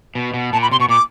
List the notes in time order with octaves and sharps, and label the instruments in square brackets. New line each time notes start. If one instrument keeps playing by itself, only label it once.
[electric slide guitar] B2
B2
[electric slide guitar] A#2 [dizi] A5
[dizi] B5
[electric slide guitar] C3 [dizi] C6
[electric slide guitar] B2 [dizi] C#6
[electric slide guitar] A#2 [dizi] D6